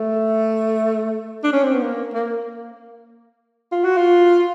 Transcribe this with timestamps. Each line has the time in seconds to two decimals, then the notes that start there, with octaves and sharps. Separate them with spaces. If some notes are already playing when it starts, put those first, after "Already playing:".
Already playing: A3
1.44 D4
1.53 C#4
1.63 C4
1.73 B3
1.81 A#3
2.14 A#3
3.72 F4
3.84 F#4
3.97 F4